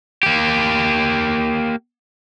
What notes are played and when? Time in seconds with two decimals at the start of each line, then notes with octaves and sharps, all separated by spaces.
0.23 A#3 G4